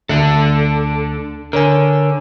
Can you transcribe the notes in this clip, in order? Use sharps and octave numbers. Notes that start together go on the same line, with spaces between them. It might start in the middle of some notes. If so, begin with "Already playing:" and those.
D2 D4 A4
D3 A#4 C#5 G#5